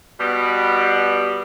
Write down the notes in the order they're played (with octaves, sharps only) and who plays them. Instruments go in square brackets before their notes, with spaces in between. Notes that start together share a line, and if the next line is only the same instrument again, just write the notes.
[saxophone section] B2 G3